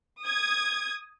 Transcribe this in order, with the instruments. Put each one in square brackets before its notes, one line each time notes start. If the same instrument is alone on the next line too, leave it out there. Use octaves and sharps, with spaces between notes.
[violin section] D#6 G#6